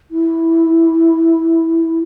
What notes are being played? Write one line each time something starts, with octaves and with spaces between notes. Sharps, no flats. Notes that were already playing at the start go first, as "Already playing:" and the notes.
E4